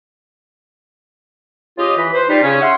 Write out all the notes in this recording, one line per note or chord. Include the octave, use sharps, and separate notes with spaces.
C#3 F4 G4 D#5
E3 B5
B4 C5
G3 D#4 F4 C5 B5
C#3 C#4
E5 F#5 C6